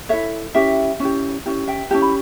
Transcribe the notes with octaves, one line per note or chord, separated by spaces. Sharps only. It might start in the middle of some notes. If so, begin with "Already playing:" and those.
E4 A4 C#5 E5
C#4 E4 G4 E5 G5
C#4 E4 G4
C#4 E4 G4
E5 G5
C#4 E4 G4 A5
B5